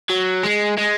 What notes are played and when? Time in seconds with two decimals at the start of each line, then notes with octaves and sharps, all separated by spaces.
0.10 F#3
0.43 G#3
0.77 G#3